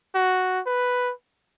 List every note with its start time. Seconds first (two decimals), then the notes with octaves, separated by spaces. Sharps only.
0.15 F#4
0.66 B4